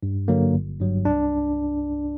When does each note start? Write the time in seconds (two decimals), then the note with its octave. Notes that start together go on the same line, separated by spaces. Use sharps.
0.03 G2
0.28 D3 F#3 A#3
0.53 G1
0.80 G2 F#3
1.05 C2 D4